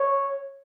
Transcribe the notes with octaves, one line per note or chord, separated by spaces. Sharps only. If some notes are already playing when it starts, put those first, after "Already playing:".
Already playing: C#5